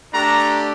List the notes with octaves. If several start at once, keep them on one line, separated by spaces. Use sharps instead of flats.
A3 D4 G4 A#5